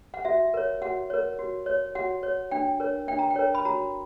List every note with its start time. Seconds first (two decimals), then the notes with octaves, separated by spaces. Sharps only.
0.14 F#5
0.25 F#4 E5
0.54 A#4 C#5
0.82 F#4 F#5
1.10 A#4 C#5
1.39 F#4
1.66 C#5
1.95 F#4 F#5
2.23 C#5
2.51 D4 G5
2.80 A#4 C#5
3.08 D4 G5
3.19 A#5
3.30 G5
3.36 A#4 C#5
3.55 B5
3.65 F#4 A#5